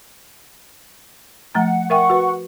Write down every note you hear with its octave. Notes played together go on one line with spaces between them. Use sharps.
F3 A3 F#5 A#5
A#4 E5 F#5 G5 C#6
F#4 B4